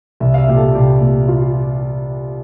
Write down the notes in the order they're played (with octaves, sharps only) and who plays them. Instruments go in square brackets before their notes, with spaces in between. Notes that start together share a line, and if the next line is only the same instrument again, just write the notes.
[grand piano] C2 E5
F5
E5
A#2 G4
A4
C2 G4
A#2
F4